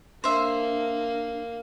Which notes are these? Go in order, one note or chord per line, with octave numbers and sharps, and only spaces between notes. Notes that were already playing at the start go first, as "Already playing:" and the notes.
A#3 D4 C5 E5